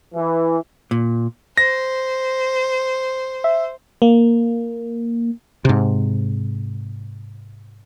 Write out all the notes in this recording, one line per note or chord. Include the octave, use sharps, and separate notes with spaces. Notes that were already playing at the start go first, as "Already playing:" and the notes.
E3
A#2
C5 A#6
E5
A#3
G#2 C3